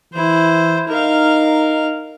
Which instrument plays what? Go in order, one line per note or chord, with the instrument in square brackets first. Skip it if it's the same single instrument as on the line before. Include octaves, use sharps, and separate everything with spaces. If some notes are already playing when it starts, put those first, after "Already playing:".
[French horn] E3 [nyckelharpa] E4 C5
[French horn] D#4 [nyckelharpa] A#4 F5